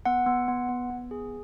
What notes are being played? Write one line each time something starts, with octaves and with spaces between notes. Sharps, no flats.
B3 F#5
B3
B3
B3
B3
G#4